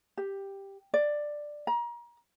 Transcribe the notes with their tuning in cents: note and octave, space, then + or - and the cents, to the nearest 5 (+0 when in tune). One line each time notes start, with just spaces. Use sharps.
G4 +5
D5 +10
A#5 +30